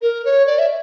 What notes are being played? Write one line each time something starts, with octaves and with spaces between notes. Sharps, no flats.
A#4
C#5
D5
E5